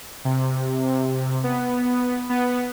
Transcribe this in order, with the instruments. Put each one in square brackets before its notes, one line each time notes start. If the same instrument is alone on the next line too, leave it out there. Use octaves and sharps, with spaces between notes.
[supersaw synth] C3
B3
B3